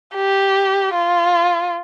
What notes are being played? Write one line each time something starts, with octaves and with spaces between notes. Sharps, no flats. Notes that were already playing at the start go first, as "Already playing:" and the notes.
G4
F4